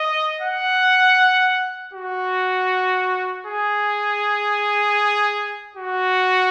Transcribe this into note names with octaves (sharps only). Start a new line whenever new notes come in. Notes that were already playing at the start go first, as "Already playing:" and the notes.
Already playing: D#5
F#5
F#4
G#4
F#4